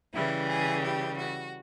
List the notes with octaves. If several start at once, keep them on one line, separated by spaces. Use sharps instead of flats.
C#3 E3 G3 E4
G#4
G4
F#4